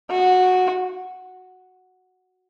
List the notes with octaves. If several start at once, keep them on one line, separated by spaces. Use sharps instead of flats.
F#4